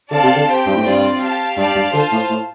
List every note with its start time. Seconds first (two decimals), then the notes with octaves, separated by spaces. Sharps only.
0.10 D3 C4 A4 D5 F5 A5
0.23 C3
0.36 D3
0.48 C4 G4 C5 G5
0.66 G2
0.76 A2
0.83 G2 C4 F4 D5
1.21 G4 F5 A5
1.57 G2 G4 D5 F5 A5
1.75 G2
1.93 D3 F4 C5 F5 A5
2.12 A2
2.30 A2